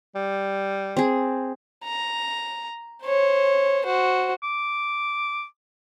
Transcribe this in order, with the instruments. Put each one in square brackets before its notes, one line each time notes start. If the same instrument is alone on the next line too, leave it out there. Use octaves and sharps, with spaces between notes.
[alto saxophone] G3
[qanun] C4 G#4
[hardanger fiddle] A#5
C5 C#5
F#4 C5
[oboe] D6